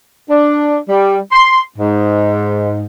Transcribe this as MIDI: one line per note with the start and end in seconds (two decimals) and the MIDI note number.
0.30 0.77 62
0.89 1.18 55
1.31 1.60 84
1.78 2.82 44